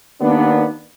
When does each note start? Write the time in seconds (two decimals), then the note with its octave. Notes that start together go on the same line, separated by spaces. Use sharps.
0.21 D#2 B3 D4